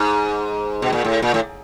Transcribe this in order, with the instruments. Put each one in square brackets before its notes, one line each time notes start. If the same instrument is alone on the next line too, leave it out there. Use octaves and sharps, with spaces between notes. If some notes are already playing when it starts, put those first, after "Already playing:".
Already playing: [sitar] G#2
B2
A#2
A2
A#2
A2